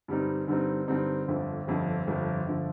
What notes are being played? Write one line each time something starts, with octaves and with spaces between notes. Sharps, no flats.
G2 D3 G3 C4 D#4
G2 D3 G3 C4 D#4
G2 D3 G3 C4 D#4
G1 F2 D3 F3
G1 F2 D3 F3
G1 F2 D3 F3
G1 D3 F3